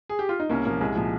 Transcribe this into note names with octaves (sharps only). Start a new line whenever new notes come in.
G#4
G4
F4
D#4
C2 A#3 C#4
A#2 F3 A#3
C2 G#3
A#2 F3